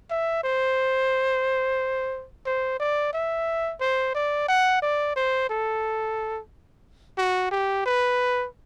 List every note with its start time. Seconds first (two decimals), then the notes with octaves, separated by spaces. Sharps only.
0.10 E5
0.44 C5
2.46 C5
2.79 D5
3.13 E5
3.80 C5
4.15 D5
4.48 F#5
4.82 D5
5.16 C5
5.49 A4
7.18 F#4
7.51 G4
7.86 B4